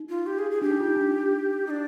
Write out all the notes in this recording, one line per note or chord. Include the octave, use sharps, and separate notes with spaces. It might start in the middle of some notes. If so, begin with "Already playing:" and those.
Already playing: D#4
F4
G4
G#4
G#4
D4 G4
D#4
F4
D#4
D4
D#4
D4